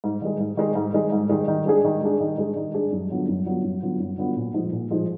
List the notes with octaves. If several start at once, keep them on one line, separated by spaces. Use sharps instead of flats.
G#2
D#3 G#3
G#2
D#3 G#3
G#2
D#3 G#3
G#2
D#3 G#3
D#3
G#3 D4 G#4
D#3
G#3 D4 G#4
D#3
G#3 D4 G#4
D#3
G#3 D4 G#4
F#2
D3 F#3 B3 F4
F#2
D3 F#3 B3 F4
F#2
D3 F#3 B3 F4
F#2
D3 F#3 B3 F4
A#2
F3 G#3 D#4
A#2
F3 G#3 D#4